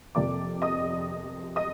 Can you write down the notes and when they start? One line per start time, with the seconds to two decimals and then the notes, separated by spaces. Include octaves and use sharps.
0.15 F2 C3 F3 A#3 D5 D6
0.62 D#5 D#6
1.56 D#5 D#6